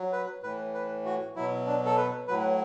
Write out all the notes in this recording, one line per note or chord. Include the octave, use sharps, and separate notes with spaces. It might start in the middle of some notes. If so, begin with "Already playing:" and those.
Already playing: F#3
B4
A2 E3 B4
B4
F#4
B2 F#3 E4
D4
A4
B4
A2 F#3 B4